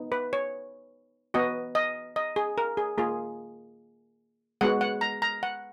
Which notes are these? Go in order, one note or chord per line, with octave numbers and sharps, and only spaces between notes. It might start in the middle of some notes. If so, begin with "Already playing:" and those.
Already playing: B3 D#4
B4
C#5
B3 F#4 D#5
D#5
D#5
G#4
A#4
G#4
A#3 F4 G#4
G#3 B3 F#4 F#5
F#5
A#5
A#5
F#5